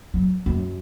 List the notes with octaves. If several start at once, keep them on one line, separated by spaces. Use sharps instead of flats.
F#3
F#2